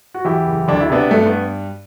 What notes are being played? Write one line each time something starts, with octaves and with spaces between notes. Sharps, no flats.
F#4
E2 E4 G4
F#1
D2 D4
E4
C3 B3 D4
G2 A3
B3